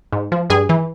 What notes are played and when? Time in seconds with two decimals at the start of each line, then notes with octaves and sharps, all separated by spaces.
0.12 G#2
0.32 F3
0.50 G2 G#4
0.69 E3